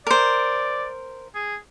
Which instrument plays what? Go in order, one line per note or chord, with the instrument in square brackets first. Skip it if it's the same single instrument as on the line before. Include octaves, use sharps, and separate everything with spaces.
[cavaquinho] A#4 C5 [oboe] D5
[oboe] G#4